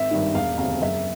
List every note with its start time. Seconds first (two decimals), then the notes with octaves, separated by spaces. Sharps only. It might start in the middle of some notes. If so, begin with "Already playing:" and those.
Already playing: G#1 E5
0.11 G2 D#3
0.34 E1 F5
0.58 D2 C3 F5
0.81 F#1 E5